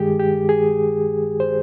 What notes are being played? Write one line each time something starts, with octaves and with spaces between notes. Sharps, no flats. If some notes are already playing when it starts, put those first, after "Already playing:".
Already playing: G2 D#3 G#3 G4 G#4
G4
G#4
C5